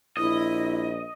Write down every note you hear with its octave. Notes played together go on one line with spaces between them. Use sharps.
A#1 E4 D#5